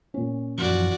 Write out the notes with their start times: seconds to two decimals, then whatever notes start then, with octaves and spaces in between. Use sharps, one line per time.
0.14 A#2 C#4
0.58 F#2 E3 F3 F#4 D5